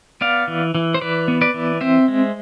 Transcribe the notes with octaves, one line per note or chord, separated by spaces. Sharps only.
B3 D5 F5
E3
E3
C5
E3 B4 D5
B3
B4 D5
E3
C4 C5 E5
G#3